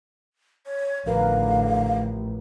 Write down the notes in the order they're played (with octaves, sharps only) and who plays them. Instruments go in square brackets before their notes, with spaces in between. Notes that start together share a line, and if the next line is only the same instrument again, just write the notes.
[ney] C#5
[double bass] A1 [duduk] D3 [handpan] F3 A#4 B4 [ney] F5